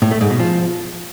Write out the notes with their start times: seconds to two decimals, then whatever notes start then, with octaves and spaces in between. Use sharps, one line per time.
0.02 A2
0.11 A3
0.21 G#2
0.30 B2
0.40 F3